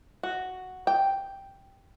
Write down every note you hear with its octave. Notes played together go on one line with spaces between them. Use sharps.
F#4
G5